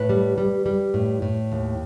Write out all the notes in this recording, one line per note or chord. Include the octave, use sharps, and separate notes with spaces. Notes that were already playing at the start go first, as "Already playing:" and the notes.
Already playing: A2 B4
G3
G3
G3
A2
A2
D#2